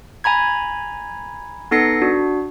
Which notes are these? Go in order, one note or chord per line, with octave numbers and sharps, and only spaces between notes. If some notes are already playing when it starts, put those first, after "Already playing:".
G#5 A#5 B5 G#6
B3 D#4 A4 A#6 C7 C#7
D4 F#4